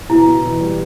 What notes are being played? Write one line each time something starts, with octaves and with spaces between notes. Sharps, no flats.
B2 E4
B2
E2
G3